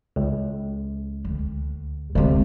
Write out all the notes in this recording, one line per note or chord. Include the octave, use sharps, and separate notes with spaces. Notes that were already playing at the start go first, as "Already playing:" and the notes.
C#2
D2
D2 C3 G#3 C4